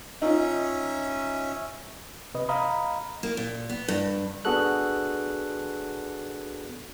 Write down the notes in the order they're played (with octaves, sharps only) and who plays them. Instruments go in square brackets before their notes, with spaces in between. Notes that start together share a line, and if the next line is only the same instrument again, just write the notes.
[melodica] C#4 E5 [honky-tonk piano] D#4 F4 D#5
[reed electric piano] C3 B4 D#5
D#5 F5 A#5 B5 D#6
[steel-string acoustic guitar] A#3
A#2
B3
G2
[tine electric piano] B3 D4 F#4 G#4 A4 F#6